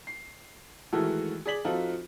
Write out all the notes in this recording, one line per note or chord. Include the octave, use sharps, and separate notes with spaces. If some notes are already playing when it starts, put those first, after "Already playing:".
C7
D#3 E3 G#3 A3 F#4 A4
G#4 D5 B6 F#7
F3 C4 D#4 F4 F#4 A4